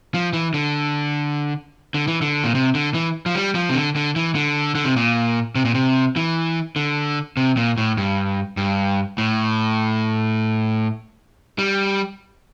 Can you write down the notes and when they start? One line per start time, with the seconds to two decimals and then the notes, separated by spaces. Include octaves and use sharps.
0.14 F3
0.33 E3
0.54 D3
1.94 D3
2.08 E3
2.21 D3
2.44 A#2
2.55 C3
2.75 D3
2.94 E3
3.26 F3
3.35 G3
3.55 F3
3.69 C3
3.75 D3
3.96 D3
4.16 E3
4.35 D3
4.75 D3
4.85 C3
4.96 A#2
5.55 C3
5.65 A#2
5.74 C3
6.16 E3
6.76 D3
7.37 C3
7.57 A#2
7.78 A2
7.97 G2
8.57 G2
9.18 A2
11.59 G3